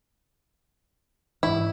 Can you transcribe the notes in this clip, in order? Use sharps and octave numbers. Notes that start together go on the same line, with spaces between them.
G#2 E3 E4